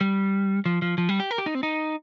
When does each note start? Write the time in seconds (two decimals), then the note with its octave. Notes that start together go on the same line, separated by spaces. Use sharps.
0.01 G3
0.66 F3
0.82 F3
0.98 F3
1.09 G3
1.20 G4
1.31 A#4
1.38 G4
1.46 D#4
1.55 C4
1.63 D#4